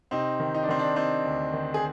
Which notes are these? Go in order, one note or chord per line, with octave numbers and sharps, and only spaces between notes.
C3 C4 D#4
D#3
D#4
D4
D#3 C4
D4
C3 C4 D#4
D2
D#3
G#4